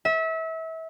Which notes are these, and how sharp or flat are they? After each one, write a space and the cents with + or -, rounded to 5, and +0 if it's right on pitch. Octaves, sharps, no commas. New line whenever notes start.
E5 -30